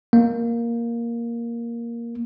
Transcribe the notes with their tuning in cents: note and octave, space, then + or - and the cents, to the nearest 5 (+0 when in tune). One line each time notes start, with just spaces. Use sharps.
A#3 +5